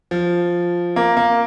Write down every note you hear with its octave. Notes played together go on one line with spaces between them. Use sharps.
F3
A#3
A#3